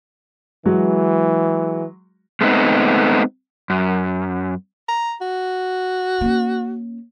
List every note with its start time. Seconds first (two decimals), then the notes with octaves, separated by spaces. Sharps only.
0.66 E3 F#3 G#3 F#4
2.41 G#3 A3 B3 C4 D#4
3.70 F#2
4.88 A#5
5.21 F#4
6.21 A#3 C#4